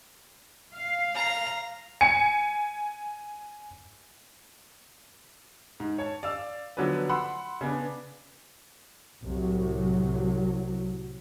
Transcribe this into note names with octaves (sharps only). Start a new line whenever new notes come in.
F5
A#5
G#5 C#7
G#2
C#5 A5
D5 F5 E6
D3 F3 F#3 B3 D4 B4
F#5 B5 C6 E6 F#6
C#3 B3 D4
C2 A2 F#3